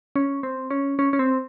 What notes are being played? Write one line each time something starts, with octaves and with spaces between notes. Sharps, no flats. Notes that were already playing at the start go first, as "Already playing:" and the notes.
C#4
C4
C#4
C#4
C#4
C4